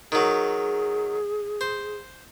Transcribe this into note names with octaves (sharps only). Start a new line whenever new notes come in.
D#3 F#3 G#4
C5